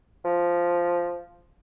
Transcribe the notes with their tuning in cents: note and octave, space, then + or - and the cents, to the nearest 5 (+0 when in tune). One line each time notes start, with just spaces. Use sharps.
F3 -5